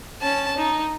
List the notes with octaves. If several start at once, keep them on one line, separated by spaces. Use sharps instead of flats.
C#4 A5
D#4